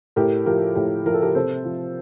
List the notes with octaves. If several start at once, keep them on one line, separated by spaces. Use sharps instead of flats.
A2 G4 A#4
F3 G4 A#4
A2 G4
F3 A#4
A4
G4 A#4
C3 A4 C5
F3